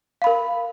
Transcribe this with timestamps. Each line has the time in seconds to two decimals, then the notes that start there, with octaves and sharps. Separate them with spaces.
0.22 F5
0.24 B5
0.27 A#4